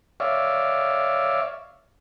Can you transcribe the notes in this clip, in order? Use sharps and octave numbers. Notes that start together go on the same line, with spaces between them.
C#5 D5 E5 F5